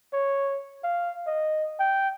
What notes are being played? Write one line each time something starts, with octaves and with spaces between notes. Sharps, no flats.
C#5
F5
D#5
G5